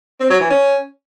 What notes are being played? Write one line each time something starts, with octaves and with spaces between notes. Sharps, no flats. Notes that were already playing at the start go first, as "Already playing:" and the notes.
C4
F#3
E3
C#4